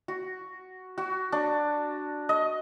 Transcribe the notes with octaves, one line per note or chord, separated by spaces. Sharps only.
F#4
F#4
D4
D#5